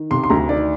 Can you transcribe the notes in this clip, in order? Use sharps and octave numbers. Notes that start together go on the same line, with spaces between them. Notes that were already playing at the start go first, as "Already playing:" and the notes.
Already playing: D#3
C3 C6
C6
D2 A#5
D#3 D5